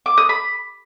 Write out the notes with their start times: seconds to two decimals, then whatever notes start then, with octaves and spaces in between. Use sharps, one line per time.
0.06 D6
0.18 D#6
0.29 B5